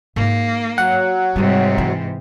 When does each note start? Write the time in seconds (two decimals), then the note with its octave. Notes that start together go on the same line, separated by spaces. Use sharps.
0.16 G#2 A#3 D#4
0.78 F#3 F#5
1.36 G#2 C3 G3 G#3
1.78 E3